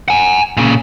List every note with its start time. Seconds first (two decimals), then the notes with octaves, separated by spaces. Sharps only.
0.08 F#5 G#5
0.57 A#2 C#3